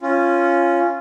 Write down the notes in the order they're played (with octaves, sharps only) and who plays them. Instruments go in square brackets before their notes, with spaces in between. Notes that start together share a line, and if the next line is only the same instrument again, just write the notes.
[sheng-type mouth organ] C#4 F4